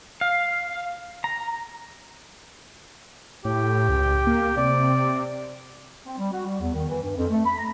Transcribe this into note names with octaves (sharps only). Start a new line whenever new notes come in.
F5
A#5
A2 G4
C#2
A#3
C3 D5
C4
G3
F#4
G3
E2
D#3
E3
G2
F2
A3
B5
A#5